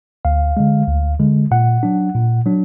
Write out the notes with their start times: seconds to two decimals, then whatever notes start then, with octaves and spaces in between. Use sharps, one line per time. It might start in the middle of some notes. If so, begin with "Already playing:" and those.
0.25 D2 F5
0.57 D3 G#3
0.88 D2
1.19 D3 G#3
1.51 A#2 F#5
1.83 F#3 D4
2.15 A#2
2.46 F#3 D4